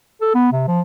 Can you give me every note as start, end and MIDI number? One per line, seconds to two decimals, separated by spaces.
0.21 0.29 69
0.34 0.51 59
0.52 0.66 48
0.68 0.81 53